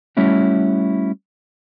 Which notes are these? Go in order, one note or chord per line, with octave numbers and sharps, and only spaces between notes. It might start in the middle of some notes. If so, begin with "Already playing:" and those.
G3 A3 C#4 E4 F#4